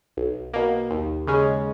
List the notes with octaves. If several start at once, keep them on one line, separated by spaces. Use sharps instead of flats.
B1
B2 A#3
D#2
C#3 G#3 C#4